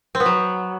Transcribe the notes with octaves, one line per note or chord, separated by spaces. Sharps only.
C4
B3
F#3